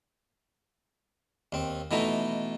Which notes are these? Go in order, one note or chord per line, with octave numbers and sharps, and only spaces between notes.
D#2 C4
B2 E3 A3 D#4